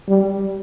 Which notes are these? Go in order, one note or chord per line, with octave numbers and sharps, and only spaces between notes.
G3